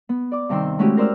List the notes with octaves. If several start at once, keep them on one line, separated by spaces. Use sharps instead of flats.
B3
D5 D6
G2 C3 D#3 G5 C6 E6
G#3 A3 C#4 E4 F#4 G4
A#4 C5 D5 E6 F6